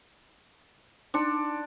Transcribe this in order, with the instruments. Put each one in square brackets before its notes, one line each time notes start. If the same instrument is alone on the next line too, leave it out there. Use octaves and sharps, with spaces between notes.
[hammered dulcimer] D4 [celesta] D#4 C6 C#7